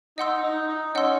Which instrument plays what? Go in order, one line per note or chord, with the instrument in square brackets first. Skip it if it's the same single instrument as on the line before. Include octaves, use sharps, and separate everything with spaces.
[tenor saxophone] D#4 [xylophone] D#5 F#5 C6 E6
[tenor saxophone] D#4
D#4
[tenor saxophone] C#4 [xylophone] D#5 F#5 C6 E6